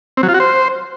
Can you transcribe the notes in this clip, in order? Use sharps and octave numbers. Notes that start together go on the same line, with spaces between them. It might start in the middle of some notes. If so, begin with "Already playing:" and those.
C4
F#3
F4
F#4
C5